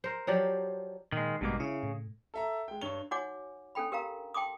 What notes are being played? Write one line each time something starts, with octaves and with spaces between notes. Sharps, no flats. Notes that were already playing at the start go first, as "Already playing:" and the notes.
A#4 C5
F3 F#3 G4 D5
A#2 D#3 G#3
A1 G2 B2 G#3 A#3 D6
C#3 E4
A2
A4 E5 A#5
G#3 G5
G2 C#5 F7 G7
D#4 F#4 C#5 F#5 G#5 D6
C#4 D4 A4 G5 B5
G4 A#4 F5 A#5
G5 A5 C6 D6 D#6